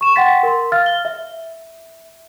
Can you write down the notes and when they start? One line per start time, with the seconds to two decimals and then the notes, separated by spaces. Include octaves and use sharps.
0.01 C#6 E7
0.16 F#5 G5 C6 A6 B6
0.43 A#4 C6
0.72 F5 F6 A6
0.86 G7
1.05 E5